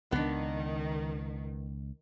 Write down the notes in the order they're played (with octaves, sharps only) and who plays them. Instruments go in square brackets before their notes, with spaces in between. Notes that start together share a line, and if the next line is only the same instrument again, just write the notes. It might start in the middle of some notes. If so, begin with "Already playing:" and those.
[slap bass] C#2 [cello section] D#3 [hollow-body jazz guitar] B3 D4